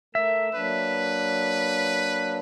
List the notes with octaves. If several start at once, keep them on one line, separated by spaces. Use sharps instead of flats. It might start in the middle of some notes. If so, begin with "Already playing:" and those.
A3 A#4 E5
F#3 A#3 D4 B4